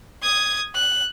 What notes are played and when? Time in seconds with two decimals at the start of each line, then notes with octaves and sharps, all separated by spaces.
0.22 D#6 G#6
0.74 F#6